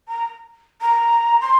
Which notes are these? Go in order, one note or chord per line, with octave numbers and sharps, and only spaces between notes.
A#5
A#5
C6